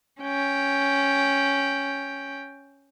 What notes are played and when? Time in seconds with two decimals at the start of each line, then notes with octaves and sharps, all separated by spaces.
0.21 C#4 G5